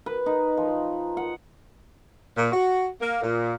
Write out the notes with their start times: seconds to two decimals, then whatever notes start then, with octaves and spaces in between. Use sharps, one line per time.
0.06 B4
0.26 D#4
0.57 F3
1.17 F#5
2.36 A#2
2.52 F#4
3.01 A#3
3.22 A#2